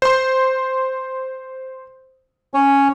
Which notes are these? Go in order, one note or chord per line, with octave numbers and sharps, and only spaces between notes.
C5 C6
C#4 C#5